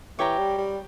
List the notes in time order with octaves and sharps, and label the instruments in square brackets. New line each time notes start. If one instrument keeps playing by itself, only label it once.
[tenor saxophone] E3 [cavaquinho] G4 C#5 G5 A#5
[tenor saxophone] G3
G3